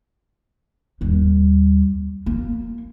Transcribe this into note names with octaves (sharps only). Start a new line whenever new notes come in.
D#2 G3
A#3